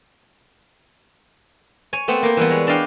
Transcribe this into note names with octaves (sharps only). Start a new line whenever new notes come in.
C#5 G#5
A3 B3 C4
A#3 G5
E3 G3 B3
G#3 C#5
D4 D5 D#5 F5 G5